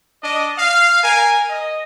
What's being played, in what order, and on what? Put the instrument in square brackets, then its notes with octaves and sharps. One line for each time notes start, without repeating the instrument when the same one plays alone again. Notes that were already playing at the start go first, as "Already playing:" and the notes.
[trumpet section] D4 D#5
F5
A#4 G#5
D#5